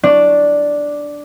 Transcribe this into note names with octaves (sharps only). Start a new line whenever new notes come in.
D4